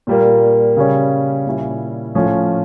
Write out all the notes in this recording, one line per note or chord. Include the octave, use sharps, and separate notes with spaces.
A#2 G3 A#3
C#3 G3 C#4
A#2 G3 C#4 E4
A2 F3 A3 C#4